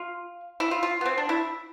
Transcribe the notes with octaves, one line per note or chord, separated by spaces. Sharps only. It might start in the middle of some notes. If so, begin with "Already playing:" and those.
Already playing: F4
E4
F4
F4
B3
C4
D4
E4